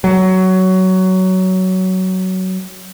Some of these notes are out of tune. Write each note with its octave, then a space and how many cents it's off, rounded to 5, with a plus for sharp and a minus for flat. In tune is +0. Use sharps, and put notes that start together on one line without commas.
F#3 +15